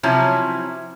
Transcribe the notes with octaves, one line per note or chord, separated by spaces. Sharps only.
C3 F3 F#3 C#4 E4